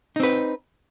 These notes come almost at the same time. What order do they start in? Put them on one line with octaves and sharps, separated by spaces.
D#4 C4 B4